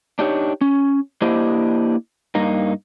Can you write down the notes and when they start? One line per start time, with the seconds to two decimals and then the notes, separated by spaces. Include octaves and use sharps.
0.19 D4 D#4 G4 C#5
0.61 C#4
1.22 A#3 D4 E4 G4 C5 D#5
2.35 G2 A#3 D#4